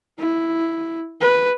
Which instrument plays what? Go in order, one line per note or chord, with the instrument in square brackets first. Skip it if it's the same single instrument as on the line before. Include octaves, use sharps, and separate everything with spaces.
[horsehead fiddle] E4
B4